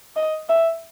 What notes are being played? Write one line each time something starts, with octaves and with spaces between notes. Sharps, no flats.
D#5
E5